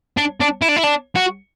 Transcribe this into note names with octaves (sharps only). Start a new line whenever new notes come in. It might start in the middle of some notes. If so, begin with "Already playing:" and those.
D4
D4
E4
D4
E4
D4
F#4